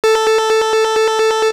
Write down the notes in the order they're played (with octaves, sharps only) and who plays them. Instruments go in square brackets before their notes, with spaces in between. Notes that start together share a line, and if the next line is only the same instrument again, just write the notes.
[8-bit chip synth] A4